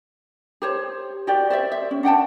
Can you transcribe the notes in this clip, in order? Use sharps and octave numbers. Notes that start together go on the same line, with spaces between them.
G4 C5 C#5
F#4 G4 D5
C5 D5 E5
E5
C#4
D4 F#5 G5 A5